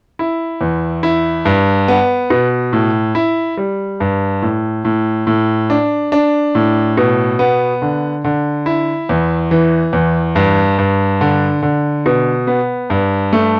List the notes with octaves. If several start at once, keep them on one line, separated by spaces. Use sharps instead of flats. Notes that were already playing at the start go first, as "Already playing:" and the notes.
E4
E2
E4
G2
B3
B2
A2
E4
G3
G2
A2
A2
A2
D4
D4
A2
B2
B3
D3
D3
E4
E2
E3
E2
G2
G2
D3
D3
B2
B3
G2
A3